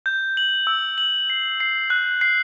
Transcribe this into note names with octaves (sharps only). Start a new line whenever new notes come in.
G6
F#7
E6
F#7
C7
C7
F#6
C7